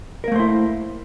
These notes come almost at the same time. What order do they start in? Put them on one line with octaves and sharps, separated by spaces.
A#4 A#3 A3 C5 E4